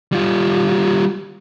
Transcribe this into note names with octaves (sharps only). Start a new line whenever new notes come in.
G3 F4